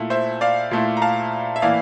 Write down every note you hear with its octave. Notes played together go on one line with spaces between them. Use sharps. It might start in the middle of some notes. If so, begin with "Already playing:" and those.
Already playing: A#2 A3 E4
C5 E5
D5 F5
A#2 A3 E4
A#5
F5 A5
E5
A2 E3 A#3 E4 D5 F5